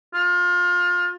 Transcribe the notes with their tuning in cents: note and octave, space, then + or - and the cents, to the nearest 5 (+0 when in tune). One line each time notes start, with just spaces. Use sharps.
F4 +25